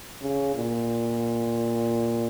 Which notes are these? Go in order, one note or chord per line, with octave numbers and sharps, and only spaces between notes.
C#3
A#2